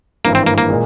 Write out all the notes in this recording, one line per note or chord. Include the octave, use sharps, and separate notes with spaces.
G#1 G2 E3 A#3
C4
A#3
A#3
A#2 G#3